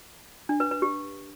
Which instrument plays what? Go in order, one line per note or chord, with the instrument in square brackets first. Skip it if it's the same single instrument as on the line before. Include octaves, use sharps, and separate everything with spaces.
[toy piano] D4
B4
B4
G4